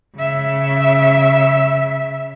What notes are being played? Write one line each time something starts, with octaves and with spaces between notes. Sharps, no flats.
C#3 E5